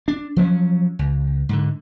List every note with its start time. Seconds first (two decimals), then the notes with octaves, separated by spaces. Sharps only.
0.08 D4
0.36 F3 F#3 A#3 C#4
0.99 C#2
1.49 G#2 D3